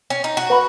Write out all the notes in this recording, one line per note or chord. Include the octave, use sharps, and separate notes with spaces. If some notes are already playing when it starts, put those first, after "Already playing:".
C#4
D#4
F#4
B4 F#5 B5